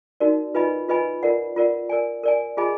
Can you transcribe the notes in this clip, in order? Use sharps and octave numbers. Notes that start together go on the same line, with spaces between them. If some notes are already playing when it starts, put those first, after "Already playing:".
D#4 F#4 A#4 D5
F4 B4 D#5 G#5 B5
F4 B4 D#5 G#5 B5
F4 A#4 D5 F#5
F4 A#4 D5 F#5
A#4 D5 G#5
A#4 D5 G#5
F4 G#4 D#5 G#5 B5